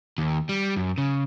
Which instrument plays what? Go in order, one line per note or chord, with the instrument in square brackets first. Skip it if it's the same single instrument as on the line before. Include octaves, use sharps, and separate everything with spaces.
[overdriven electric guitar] D#2
G3
F#2
C#3